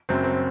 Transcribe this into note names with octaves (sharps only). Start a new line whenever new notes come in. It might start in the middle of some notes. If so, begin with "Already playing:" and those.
F#1 F#2 F#3 C4
C4